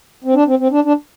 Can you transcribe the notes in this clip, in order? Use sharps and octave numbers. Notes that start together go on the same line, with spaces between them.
C4
D4
C4
C4
D4
D4